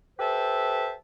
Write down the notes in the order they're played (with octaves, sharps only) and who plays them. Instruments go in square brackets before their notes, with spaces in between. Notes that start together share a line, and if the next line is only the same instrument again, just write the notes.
[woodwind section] G4 A4 B4 C5 E5 A5